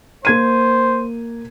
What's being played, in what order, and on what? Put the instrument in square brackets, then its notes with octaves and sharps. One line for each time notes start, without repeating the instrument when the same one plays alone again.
[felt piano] A#3 G#6 D#7 [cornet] C5